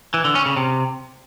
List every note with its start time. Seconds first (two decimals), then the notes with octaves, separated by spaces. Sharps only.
0.14 E3
0.25 D3
0.35 C#4
0.46 C#3
0.57 C3